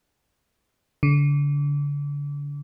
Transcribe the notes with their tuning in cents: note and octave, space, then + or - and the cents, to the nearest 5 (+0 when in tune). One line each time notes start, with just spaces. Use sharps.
D3 -35